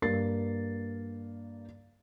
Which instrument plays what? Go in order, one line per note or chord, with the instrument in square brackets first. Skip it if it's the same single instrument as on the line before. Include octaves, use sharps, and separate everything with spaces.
[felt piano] G2 A#3 A6 C7